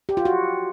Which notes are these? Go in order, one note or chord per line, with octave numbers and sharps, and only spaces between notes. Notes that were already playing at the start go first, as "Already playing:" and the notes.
G4
F4
F#4